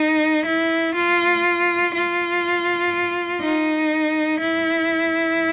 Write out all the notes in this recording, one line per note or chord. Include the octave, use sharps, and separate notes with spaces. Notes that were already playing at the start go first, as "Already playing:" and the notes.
Already playing: D#4
E4
F4
F4
D#4
E4